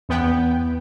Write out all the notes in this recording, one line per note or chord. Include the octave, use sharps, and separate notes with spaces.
E2 B3 G5